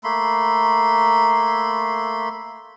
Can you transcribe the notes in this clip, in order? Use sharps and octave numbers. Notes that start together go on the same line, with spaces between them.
A3 A#3 B5 C6